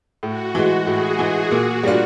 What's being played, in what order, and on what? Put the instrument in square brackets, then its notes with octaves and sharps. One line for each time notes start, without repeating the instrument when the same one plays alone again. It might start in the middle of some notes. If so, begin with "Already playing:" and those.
[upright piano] A2 [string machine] F#4
[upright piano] E3 G#3
[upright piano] A2 [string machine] G#4
[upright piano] E3 G#3
[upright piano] A#2 [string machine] F#4
[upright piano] G3 A#3 D4 F4